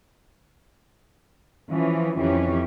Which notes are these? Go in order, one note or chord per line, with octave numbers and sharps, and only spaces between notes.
E3 F3 C#4
F2 E3 C#4 G4